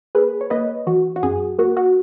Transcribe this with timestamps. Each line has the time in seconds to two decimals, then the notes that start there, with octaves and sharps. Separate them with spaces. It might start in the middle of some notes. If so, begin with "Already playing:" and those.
0.15 A#3 G#4 B4
0.41 C#5
0.50 A#3 B4 D#5
0.87 E3 F#4
1.16 F#4
1.23 F#2 G#4
1.59 A#3 F#4
1.77 F#4